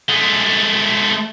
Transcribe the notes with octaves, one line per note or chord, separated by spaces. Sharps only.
G#3 A3